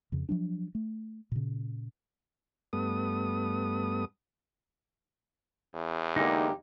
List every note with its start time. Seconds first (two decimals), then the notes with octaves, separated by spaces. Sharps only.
0.12 F2 C#3
0.29 F3 F#3 D4
0.75 A3
1.32 A#2 C#3
2.73 G2 A3 B3 D#6
5.75 E2
6.16 D3 G#3 A#3 D#4 G4